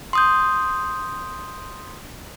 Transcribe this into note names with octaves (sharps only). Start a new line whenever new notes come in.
C6 D#6 G6